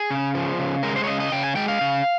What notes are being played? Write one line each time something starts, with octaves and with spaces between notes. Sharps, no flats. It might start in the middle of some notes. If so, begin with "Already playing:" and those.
Already playing: G#4
C#3
F3
C#3
G#3 A#4
C5
C#5
C#3 D#5
D#5
C#3 G5
G#5
G#3 G5
F5
C#3